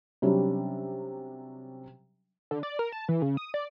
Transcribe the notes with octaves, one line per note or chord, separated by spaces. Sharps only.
C3 F#3 G3 C#4 D4
D3
D5
A#4
A5
E3
C#3
D#6
D5